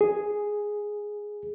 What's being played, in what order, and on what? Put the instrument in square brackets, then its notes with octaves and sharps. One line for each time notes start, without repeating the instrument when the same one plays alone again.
[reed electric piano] G#4